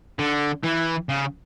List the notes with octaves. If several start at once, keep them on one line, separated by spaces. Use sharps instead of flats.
D3
E3
C#3